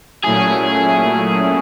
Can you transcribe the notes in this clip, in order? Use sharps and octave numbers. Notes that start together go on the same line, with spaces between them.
A#2 F#3 A3 C#4 E4 G#4